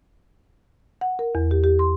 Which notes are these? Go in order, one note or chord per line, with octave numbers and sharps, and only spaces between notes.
F#5
A#4
E2
G4
G4
C6